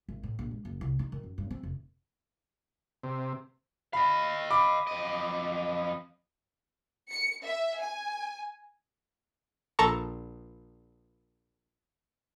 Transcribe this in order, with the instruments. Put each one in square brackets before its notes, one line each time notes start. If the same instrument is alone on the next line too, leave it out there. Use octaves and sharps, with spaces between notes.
[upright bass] G#1
A2
A#1
G#3
F#1
C2
D#4
D#3
F#2
G2
C4
F1
[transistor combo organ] C3
[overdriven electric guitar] D#5 F5 [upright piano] B5
[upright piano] B5 D6
[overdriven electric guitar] F2 D#5
[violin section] C#7
E5
G#5
[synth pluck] A#1 A4 A5 A#5 C#6